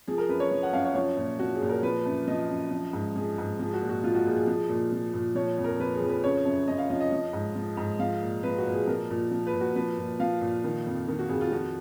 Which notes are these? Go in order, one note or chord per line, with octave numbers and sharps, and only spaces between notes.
F3 G#4
A#4
F#2 B4
C#5
F3
F#5
F#2 F5
C#5
F3 C#5
A#2
F3 F#4
G#4
A#2
A#4
F3 B4
F#2
F3 D#5
F#2
F3
G#2
F3 G#4
G#2
F3 G#4
F#4
A#2
F#4
F3 F4
F#4
A#2 G#4
G#4
F3 G#4
A#2
F3
A#2
F3 C#5
F2
A#4
F3 B4
G#4
F2
B4
C#3 C#5
F#2
F#2 D#5
F5
F3 D#5
D#5
F3
G#2
F3
G#2
F3 F5
A#2
F3 B4
F#4
A#2
G#4
F3 A#4
A#2
F3
B4
A#2
F#4
F3 B4
A#2
F3 F5
A#2
D#3
F2
D#3
F#4
F2 G#4
F4
F3 F#4